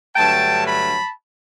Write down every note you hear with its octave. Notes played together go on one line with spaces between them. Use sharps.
G2 D3 F#3 A3 G5 A5
A5 B5